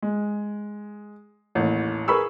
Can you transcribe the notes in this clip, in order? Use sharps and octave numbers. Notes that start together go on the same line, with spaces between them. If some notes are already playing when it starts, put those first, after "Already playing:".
G#3
A1 D#2
G#4 A#4 B4 B5 C#6 E6